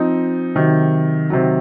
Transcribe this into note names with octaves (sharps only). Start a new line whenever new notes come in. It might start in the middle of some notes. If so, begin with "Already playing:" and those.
Already playing: F3 C4 D#4
C3 D#3 F#3
C3 D#3 F#3